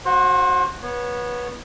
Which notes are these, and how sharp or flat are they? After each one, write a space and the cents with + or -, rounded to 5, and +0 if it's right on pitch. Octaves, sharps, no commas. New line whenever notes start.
F#4 +0 C5 +30 F5 +45
B3 -20 C#5 -5